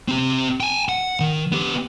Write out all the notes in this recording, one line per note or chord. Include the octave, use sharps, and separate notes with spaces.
C4 G4
G5 G#5
F#5
D#3
B3 G4